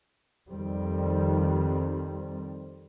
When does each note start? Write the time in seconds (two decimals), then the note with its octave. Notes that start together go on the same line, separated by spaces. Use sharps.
0.49 F2 D#3 G3 C4